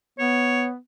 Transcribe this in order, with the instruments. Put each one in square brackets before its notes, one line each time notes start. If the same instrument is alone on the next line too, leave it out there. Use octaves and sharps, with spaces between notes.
[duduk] B3 [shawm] C#5